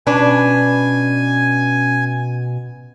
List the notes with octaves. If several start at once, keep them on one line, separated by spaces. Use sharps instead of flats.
B2 C#4 D4 B4 G#5